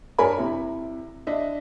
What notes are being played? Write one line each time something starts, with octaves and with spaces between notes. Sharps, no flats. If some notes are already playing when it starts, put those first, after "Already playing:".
G2 A#4 C#5 G#5 B5
C3 E4
D4 D#5 E5